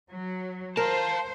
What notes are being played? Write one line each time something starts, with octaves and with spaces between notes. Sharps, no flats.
F#3
A#4 C5 F5 A5